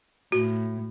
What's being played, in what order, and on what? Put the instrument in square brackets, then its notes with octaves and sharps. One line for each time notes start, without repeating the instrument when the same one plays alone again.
[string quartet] A2 [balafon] F#4